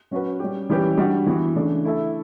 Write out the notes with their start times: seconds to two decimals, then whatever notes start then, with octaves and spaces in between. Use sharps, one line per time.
0.11 F#3 C#4 F#4 B4
0.39 G3 C#4 G4
0.70 E3 G3 C#4 G4 B4
0.97 G3 D4 F#4
1.26 E3 B3 F#4
1.56 C#3 E3 A3 D4
1.84 A3 E4 A4 E5